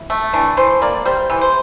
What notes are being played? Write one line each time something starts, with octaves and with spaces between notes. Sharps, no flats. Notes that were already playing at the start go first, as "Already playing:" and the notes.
Already playing: E4
A3
E3 D4
E3 C5
A#3 D5
G3 C5
E3
C5